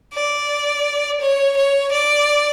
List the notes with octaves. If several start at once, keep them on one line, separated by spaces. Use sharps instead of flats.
D5
C#5
C#5
D5